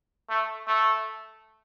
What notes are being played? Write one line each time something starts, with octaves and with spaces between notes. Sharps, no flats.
A3
A3